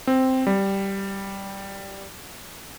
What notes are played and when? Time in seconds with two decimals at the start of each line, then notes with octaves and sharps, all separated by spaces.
0.07 C4
0.47 G3